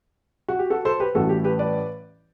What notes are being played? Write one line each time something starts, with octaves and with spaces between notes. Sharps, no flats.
F#4
G4
F#4 A4
A4 C5
G4 B4
A1 A2 E3 G3 F#4 A4
G4
G4 B4
B4 D5